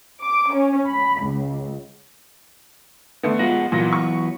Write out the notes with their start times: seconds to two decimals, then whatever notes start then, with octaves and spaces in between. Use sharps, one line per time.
0.20 D6
0.52 C#4
0.89 B5
1.23 C#2
3.23 D3 A3 B3
3.39 F3 G#3 B3 F#4 A#6
3.72 A#2 E3 F#3 B3 A#6
3.93 C#6